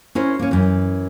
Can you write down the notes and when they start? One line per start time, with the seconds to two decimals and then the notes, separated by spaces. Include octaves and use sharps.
0.15 C#4 E4 A#4 C5
0.39 A#3 C#4
0.51 F#2 E3